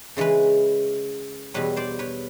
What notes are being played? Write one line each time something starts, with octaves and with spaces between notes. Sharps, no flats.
C#3 E3 G#3 B4 C#5
E2 B2 G3 B4 C#5
C5 D5
B4 C#5